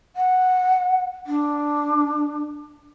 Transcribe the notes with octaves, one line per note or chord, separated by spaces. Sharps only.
F#5
D4